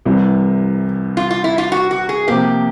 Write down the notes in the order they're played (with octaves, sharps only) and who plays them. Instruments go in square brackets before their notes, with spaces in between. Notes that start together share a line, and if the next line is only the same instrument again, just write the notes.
[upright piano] C2 C3 E3 G3 C4
[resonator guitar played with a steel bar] F4
F4
E4
F4
F#4
F#4
G#4
[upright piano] C3 F3 A#3 [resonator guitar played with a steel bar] G4